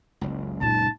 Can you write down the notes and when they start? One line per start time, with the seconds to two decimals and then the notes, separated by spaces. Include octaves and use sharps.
0.21 F#1 C#2
0.61 A#2 D#4 A5